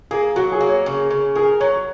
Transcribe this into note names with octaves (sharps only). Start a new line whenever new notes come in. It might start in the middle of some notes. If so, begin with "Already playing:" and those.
A#3 G#4
F#3 F#4
G#4
A#3
C#5
C#3
C#3
G#4 A#4
F#3 C#5